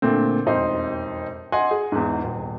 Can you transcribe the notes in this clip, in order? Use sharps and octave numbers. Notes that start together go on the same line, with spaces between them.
A#2 D3 A3 C4
E1 F2 D#4 C5 C6
D#5 F#5 G#5 C6
G#4
E2 G#2
D#1